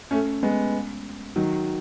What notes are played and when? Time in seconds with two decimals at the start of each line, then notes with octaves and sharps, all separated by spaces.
0.11 A3 C#4
0.43 G#3 B3
1.36 D#3 F#3